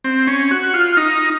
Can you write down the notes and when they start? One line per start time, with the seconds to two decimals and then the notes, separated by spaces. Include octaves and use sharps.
0.04 C4
0.27 C#4
0.51 F#4
0.74 F4
0.97 D#4